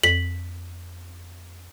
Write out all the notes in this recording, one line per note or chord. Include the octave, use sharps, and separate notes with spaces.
F2 B6 F#7